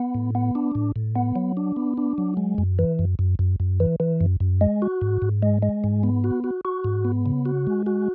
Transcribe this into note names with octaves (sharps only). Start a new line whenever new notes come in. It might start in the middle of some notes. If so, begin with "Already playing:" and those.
Already playing: B3
A2
B3
D4
A2
A2
B3
F#3
D4
B3
D4
F#3
G#3
F#2
E3
F#2
F#2
F#2
F#2
E3
E3
F#2
F#2
G#3
F#4
G#2
G#2
G#3
G#3
G#2
B3
F#4
F#4
F#4
G#2
B3
C#3
F#4
G#3
F#4